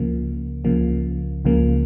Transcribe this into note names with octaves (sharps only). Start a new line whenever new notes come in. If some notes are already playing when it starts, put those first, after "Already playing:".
Already playing: C#2 C#3 F3 A#3
C#2 C#3 F3 A#3
C#2 C#3 F3 A#3